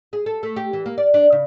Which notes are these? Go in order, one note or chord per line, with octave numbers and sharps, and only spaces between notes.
G#4
A4
A3
G4
E3
A#3
D5
D4
C#3